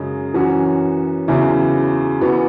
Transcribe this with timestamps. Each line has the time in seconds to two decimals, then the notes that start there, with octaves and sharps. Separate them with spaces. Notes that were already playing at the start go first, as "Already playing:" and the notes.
Already playing: F#2 C#3 G#3
0.34 F#2 E3 C#4 F#4
1.28 E2 C#3 F#3 E4
2.21 E2 E3 B3 F#4